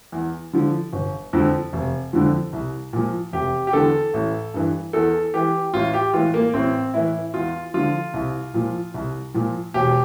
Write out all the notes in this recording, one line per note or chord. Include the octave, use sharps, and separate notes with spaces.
E2
D3 F3
G1
F2 D3 F3
F1
F2 D3 F3
C2
A#2 F3
F1 G4
G4
E2 D3 A4
A1
G2 E3
E2 A4
E3 G4
A1 F4
G4
A2 E3 F4
A#3
A1 C4
A2 E3 E4
E2 F4
D3 F3 F4
C2
A#2 F3
C2
A#2 F3
E1 G4